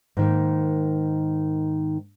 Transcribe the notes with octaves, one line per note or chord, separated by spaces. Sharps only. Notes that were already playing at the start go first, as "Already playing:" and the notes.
G#2 D#3 A#3